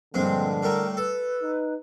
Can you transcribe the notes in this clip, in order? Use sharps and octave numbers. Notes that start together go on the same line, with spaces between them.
A#1 G2 D3 G#3 C4
A2 G3 A3 A#4
A4 B4
D#4